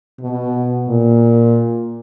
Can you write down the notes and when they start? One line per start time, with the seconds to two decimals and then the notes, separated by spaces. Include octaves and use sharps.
0.20 B2
0.89 A#2